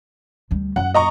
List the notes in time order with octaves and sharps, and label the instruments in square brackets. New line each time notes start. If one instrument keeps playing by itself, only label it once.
[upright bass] D2 G3
[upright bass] F#2 [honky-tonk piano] F#5
[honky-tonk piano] D#5 A#5 C#6